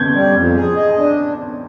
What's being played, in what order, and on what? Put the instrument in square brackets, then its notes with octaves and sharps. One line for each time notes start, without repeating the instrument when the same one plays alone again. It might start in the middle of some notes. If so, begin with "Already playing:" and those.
Already playing: [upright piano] G6 G#6
[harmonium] G3
F2
G#4
D#5
D4